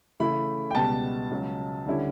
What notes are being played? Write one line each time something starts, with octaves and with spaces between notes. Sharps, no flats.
C#3 E3 A3 E4 B5
G5
C#2 B2 G3 B3 A5
C#2 C#3 F#3
D2 D3 G3 C#4 E4